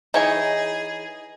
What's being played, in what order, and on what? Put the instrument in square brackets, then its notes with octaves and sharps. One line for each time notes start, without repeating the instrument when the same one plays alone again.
[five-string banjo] E3 C#5 G#5 [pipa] D#4 [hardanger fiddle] G#4